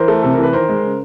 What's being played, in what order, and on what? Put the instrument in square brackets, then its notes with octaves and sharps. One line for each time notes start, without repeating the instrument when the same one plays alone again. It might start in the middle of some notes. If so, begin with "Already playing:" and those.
Already playing: [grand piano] E3 A#4 C5
A3
C3 A4
A#4
E3 B4
D#3 A#4 C5
G#3
C#3